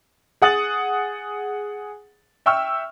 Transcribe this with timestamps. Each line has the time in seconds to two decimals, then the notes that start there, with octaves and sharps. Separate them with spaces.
0.42 G#4 F#5 D#6 A6 F#7
2.46 E5 G5 C#6 E6 F6